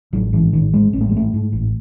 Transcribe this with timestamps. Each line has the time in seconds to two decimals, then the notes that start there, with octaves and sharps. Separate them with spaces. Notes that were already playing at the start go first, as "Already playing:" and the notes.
0.13 A1 F#3
0.33 G#2 E3
0.53 A1 D#3
0.73 G#2 G#3
0.93 A1 C4
1.01 A3
1.09 G#3
1.12 G#2 A3
1.33 G#2
1.53 A1